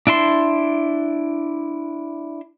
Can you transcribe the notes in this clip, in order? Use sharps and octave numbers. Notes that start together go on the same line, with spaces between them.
D4 E4 A5 C6